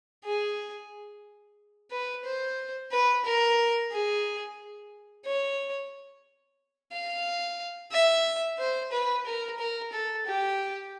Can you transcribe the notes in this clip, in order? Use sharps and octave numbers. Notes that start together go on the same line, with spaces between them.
G#4
B4
C5
B4
A#4
G#4
C#5
F5
E5
C5
B4
A#4
A#4
A4
G4